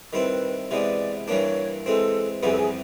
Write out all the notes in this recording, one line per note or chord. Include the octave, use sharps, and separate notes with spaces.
D#3 G3 C4 E4 B4
C3 E3 G#3 B3 D5
G2 E3 G3 A#3 D4 C#5
E3 G#3 C4 A4
F2 C3 E3 G3 B3 G#4
A4
G#4